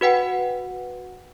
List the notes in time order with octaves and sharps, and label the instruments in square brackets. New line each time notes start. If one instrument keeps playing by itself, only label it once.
[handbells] F#4 B4 F#5 G5